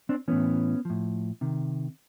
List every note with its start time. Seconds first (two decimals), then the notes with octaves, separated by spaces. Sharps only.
0.09 C4 D4
0.28 A2 E3 B3 C#4
0.85 A2 F3
1.41 C3 D#3